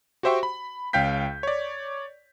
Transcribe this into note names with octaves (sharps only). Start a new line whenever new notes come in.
F#4 G4 C5 E5 G5 C#6
B5
C#2 C#4 F5 G5 G6 B6
C#5 D5